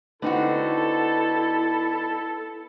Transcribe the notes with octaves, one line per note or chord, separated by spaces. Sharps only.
D3 B3 C4 D#4 E4 F#4 A4